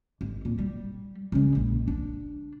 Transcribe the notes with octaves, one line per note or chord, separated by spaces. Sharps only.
G#1
A#2
G3
C#3 G#3
A#1
D4